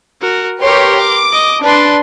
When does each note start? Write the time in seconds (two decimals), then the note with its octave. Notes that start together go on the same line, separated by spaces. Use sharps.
0.22 F#4 A#4
0.62 G4 A#4 B4 C#5 C6
1.00 D6
1.32 D#5
1.63 D4 B4 C6